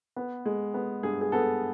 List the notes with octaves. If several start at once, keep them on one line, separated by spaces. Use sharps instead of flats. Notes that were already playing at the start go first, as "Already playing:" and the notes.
B3
G#3
B3
G2 G#4
G#4
B3 A4